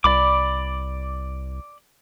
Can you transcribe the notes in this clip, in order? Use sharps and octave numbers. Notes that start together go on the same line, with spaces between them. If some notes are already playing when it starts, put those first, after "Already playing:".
C2 D5 B5 D6